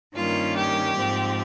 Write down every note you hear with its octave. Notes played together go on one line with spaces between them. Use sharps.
G2 D#3 G3 A#3 C#4 F4
G4
G#2 F3 C4